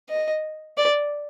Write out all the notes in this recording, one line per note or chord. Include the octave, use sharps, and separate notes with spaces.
D#5
D5